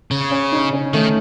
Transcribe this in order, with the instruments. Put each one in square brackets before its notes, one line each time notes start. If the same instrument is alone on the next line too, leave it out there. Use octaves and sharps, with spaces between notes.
[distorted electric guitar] C#3
[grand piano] C#4
D#4
C#4
[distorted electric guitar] D#3 [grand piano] A3